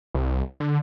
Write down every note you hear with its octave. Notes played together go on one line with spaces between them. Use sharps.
C2
D3